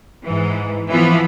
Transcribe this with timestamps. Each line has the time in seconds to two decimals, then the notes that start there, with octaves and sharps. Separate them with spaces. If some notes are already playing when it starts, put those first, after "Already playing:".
0.23 G#2 E3
0.89 E3 F3 B3